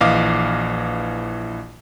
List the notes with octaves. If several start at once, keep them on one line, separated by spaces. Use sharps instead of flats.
A#1 E3 D#5 F5 D6